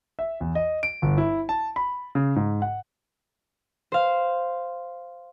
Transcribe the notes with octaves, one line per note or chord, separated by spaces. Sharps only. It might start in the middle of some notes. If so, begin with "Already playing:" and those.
E5
E2
D#5
D7
G1
E4
A5
B5
C#3
G#2
F#5
C5 F5